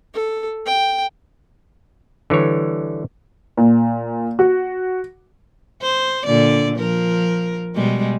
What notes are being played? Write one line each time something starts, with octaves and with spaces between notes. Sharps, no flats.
A4
G5
D3 E3 G3 C#5
A#2
F#4
C5
A#2 D3 D5
F3 A#4
B2 G3 G#3